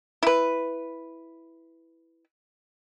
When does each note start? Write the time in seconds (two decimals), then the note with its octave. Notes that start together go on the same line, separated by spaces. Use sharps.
0.23 E4 B4